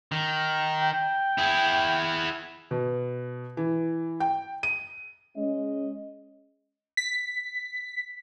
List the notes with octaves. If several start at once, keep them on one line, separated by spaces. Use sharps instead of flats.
D#3
G5
E4 G#4
B2
E3
G5
D#7
G#3 C#4 D#5
B6